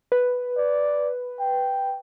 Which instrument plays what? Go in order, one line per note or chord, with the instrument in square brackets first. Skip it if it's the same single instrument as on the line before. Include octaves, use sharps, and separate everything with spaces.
[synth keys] B4
[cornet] D5
G5